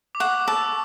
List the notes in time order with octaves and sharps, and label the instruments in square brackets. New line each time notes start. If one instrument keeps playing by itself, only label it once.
[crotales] D6
[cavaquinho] F#5 [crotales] C#6
[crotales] D6
[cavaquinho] A5 [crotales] E6
[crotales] D6